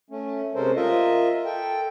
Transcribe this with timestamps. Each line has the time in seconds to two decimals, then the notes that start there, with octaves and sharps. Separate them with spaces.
0.11 A3 C#4
0.55 C3 G#3 C#4 A4 A#4 C5
0.76 F4 A#4 D#5 E5
1.45 A4 G5